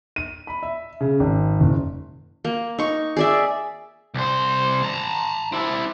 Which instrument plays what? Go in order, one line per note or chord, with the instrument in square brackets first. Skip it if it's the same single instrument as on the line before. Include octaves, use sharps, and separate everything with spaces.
[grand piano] D#7
B5
E5
C#3
G#1
F#1
[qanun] A#3
D#4 C#6
G#4 D5 E5
[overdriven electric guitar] C2 C5
A5 A#5
C4 E4